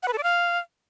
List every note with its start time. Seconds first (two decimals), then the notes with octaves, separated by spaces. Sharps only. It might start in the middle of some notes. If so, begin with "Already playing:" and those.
0.03 F#5
0.08 B4
0.13 A4
0.18 D5
0.23 F5